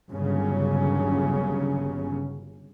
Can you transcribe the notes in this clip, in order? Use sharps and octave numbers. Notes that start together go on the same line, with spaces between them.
G1 D#2 C#3 F#3 C#4